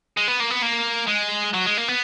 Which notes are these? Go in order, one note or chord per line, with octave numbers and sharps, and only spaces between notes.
G#3
B3
A#3
B3
A#3
G#3
F#3
G#3
A#3
B3